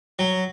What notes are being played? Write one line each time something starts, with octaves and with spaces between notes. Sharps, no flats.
F#3